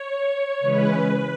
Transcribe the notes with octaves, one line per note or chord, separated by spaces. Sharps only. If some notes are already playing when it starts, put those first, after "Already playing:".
Already playing: C#5
C#3 E3 G#3 C#4 B4